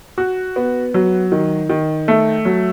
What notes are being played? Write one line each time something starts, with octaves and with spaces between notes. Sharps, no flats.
F#4
B3
F#3
D#3
D#3
A3
F#3